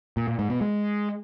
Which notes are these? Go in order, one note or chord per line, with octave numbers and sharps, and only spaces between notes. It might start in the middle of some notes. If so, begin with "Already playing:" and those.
A#2
A#2
G#2
B2
G#3